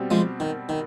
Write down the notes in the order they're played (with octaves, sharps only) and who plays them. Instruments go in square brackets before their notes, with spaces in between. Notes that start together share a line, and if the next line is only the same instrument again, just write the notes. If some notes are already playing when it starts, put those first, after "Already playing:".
Already playing: [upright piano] B2 G3 C4
[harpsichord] F3 G#3
D#3
D#3